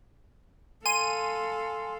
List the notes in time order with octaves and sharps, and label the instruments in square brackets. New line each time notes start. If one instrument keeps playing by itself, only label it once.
[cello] A4 F5 [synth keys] G#5 C6 [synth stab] D#7